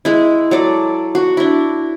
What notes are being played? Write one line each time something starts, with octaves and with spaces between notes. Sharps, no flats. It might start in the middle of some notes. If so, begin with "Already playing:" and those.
G#3 E4
F#3 A4 D5
F#4
D4 E4